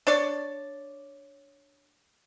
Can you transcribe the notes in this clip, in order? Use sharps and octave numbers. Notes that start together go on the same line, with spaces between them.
D4 C#5 D5